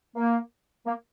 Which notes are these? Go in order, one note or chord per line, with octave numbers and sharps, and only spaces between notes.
A#3
A#3